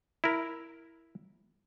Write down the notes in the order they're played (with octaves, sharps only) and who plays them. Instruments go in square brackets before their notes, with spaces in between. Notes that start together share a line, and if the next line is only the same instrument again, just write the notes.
[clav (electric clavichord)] E4 A#4